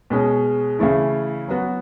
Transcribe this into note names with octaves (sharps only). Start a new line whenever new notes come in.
B2 G#3 C#4
C#3 E3 A3 E4
F#3 B3 F#4